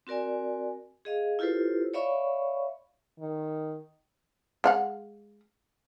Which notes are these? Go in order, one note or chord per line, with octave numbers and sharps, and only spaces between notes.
C4 F#4 A#4 D5 G#5
G#4 D#5 F5
E4 F4 G4 A4 B4 C5
C#5 D5 E5 F5 B5 C#6
D#3
G#3 F5 F#5